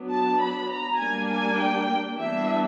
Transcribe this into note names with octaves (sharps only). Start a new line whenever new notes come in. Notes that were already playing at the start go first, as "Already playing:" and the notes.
Already playing: F#3 B3 D4
A5
B5
A#5
G3 A#3 D4 G#5
G#5
G5
E3 G3 B3 D4 E5